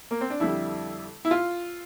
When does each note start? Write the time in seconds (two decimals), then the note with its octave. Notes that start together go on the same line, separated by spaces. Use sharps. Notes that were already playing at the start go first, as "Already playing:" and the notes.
0.11 A#3
0.21 C4
0.30 D4
0.40 F2 D3 G3 E4
1.25 E4
1.31 F4